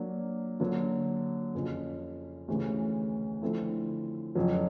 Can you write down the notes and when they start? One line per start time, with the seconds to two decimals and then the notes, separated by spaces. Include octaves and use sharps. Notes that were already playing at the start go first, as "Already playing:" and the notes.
Already playing: F#3 A#3 D4
0.60 D3 F#3 A#3
1.55 F2 C#3 F3
2.48 D2 C#3 E3 G#3
3.42 D3 F3 A3 C4 E4
4.35 F2 C#3 F#3